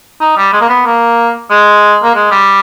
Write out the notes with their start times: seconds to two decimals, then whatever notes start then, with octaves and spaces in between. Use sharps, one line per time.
0.21 D#4
0.37 G3
0.53 G#3
0.61 A#3
0.69 B3
0.86 A#3
1.50 G#3
2.03 A#3
2.15 G#3
2.31 G3